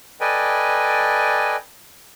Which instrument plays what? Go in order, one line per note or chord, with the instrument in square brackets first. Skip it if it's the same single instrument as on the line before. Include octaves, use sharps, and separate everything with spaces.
[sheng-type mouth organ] A4 B4 D5 D#5 G5 G#5